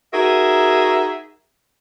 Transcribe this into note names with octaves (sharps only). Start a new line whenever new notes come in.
D#4 F#4 G#4 A#4 E5